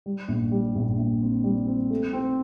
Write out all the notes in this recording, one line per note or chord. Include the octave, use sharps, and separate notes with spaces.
G3
A#1
G3
A#1
A#1
C4
G3
C4
A3
C4